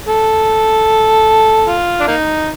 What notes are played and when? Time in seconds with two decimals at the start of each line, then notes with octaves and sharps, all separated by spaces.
0.08 A4
1.67 F4
2.00 D4
2.07 A#3 D#4